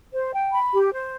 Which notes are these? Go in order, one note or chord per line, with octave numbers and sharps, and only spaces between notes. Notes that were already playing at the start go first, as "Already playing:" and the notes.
C5
G5
B5
G4
C5